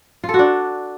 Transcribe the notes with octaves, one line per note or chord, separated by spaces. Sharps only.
F4
A4
F#4
D4